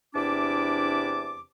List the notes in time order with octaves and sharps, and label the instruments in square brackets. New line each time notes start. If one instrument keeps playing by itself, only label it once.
[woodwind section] E2 C3 D4 E4 A5 D6